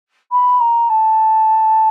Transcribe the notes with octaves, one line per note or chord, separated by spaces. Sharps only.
B5
A#5
A5